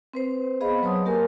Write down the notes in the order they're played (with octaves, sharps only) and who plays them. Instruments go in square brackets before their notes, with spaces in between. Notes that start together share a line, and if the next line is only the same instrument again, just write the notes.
[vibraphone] C4 B4 C5
B3 G#4 C5 D#5 F5 B5
F#3 B4 C#5 A5 C6 D#6
A#3 G4 A#4 G#5